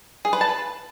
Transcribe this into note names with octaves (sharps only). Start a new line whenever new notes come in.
G#4
B4
A5
B4